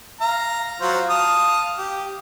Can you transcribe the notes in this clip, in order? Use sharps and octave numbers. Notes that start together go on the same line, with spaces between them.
F5 A#5
F#3 F4 C5
F5 A5 D#6
G4